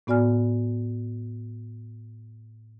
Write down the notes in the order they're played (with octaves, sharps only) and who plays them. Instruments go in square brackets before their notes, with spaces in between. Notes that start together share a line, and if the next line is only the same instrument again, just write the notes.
[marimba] A2 B3 F#4 D5 G#5 F6